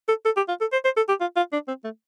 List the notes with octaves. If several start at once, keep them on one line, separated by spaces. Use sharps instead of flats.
A4
A4
G4
F4
A4
C5
C5
A4
G4
F4
F4
D4
C4
A3